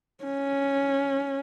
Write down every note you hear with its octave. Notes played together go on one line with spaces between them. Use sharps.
C#4